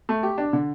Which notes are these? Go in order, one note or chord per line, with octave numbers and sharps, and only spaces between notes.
A3
G4
D4
D3